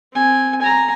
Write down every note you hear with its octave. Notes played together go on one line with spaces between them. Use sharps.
C4 G#5
G#5 A#5